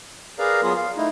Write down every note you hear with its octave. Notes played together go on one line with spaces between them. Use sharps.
G#4 A#4 B4 D5 F5 A#5
F#3 B3 F4 G#4
F5
A3 D#4 E4